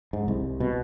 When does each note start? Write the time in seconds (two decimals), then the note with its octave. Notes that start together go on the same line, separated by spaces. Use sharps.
0.13 G#2
0.28 C2
0.60 B2